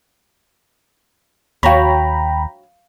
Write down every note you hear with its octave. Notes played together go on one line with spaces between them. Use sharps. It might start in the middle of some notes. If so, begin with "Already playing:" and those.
D#2 F#4 C#5 F5 G5 A#5 B5 C#6